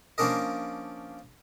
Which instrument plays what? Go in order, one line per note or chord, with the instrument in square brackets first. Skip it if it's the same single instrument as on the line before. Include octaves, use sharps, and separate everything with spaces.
[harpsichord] F3 A#3 C#4 D4 A#4 D#5